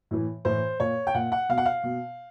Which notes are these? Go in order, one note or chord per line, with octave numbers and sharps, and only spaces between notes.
A2 E3
A2 E3 C5
A#2 C#5
G5
A#2 F#5
F#5
B2 F5
F#5
F5
B2